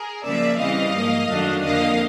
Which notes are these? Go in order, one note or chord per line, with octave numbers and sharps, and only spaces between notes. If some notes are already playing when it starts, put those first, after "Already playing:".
Already playing: G#4 A#4
C#3 F3 A#3 D5 E5
C#3 E3 G3 C4 D#5 F5
G#2 F3 A#3
F#2 D#3 F#3 A3 D4
F2 D3 F3 A#3 D#5 F5